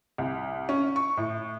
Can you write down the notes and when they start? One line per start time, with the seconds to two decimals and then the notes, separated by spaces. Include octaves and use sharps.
0.18 C2
0.69 C#4
0.96 C#6
1.17 A2